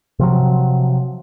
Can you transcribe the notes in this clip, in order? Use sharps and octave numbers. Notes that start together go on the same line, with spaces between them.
C3 F3 F#3